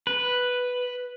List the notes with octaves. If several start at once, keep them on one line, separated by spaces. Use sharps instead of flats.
B4